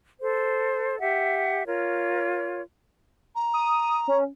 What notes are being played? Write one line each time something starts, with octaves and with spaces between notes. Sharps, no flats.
A4 C5
G4 E5 F#5
F4 A#4 C#5
A#5
D#6
C#4